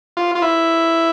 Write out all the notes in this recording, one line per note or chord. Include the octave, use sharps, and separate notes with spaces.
F4
F4
E4